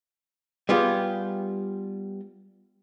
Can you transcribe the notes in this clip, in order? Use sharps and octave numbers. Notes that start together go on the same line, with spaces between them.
G3 B3 F4 G4 G#4